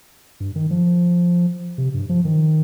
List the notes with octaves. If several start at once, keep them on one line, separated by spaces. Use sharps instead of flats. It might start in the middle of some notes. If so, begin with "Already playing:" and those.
G2
D#3
F3
C3
G2
F3
D#3